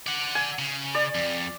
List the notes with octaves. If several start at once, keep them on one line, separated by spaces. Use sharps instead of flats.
D5 F#5
G#5
C#3
D5
F2